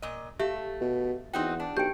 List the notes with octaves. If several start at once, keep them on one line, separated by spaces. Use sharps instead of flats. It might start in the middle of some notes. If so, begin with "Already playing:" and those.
A#2 D#5
A3 G4 E5 F5
B2
E2 C4 D#4 F#4 G5
D4
B1 G4 B4 G5 G6 D7